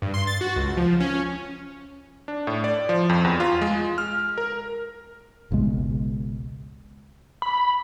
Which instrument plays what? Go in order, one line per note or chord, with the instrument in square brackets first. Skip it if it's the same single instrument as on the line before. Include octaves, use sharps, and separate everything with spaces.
[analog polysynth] G2
C6
A6
F#4
C#2
F3
C#4
[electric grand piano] D4
A2
D5
F3
F2
E2
F4
G#3
F6
A#4
[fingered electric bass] G#1 C#2 B2 G#3
[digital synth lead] B5